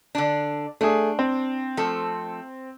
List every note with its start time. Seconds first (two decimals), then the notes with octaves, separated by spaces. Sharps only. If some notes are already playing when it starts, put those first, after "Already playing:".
0.15 D3 D4
0.81 A3 D4 G#4
1.19 C4
1.77 F3 A3 A4